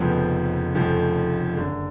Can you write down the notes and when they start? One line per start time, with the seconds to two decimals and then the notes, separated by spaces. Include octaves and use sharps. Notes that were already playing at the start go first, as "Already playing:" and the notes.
Already playing: F1 F2 C#3 F3 B3
0.74 F1 F2 C#3 F3 A3
1.56 F#1 F#2 D3